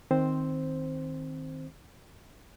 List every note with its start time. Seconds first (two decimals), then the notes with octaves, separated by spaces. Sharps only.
0.11 D#3 C4 C5